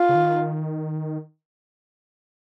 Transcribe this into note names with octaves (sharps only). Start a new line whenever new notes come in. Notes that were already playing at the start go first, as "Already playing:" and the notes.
Already playing: F4
C#3
D#3